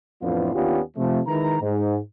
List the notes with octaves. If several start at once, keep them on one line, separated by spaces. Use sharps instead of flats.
F2 A2 E3 B3 D4 F4
D#2 B3 C#4 D4 F4 G4
C3 F3 A3
D#3 G#3 E4 B4 A#5
G#2